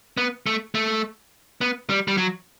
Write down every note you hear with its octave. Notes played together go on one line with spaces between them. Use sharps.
B3
A3
A3
B3
G3
G3
F#3